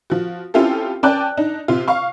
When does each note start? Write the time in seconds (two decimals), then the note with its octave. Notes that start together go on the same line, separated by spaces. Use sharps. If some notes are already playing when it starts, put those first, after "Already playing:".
0.10 F3 F#4
0.54 C4 C#4 E4 F4 G4 A4
1.03 C#4 D5 G5 A5 F#6
1.37 D4 D#4
1.68 C3 F4
1.88 F5 C#6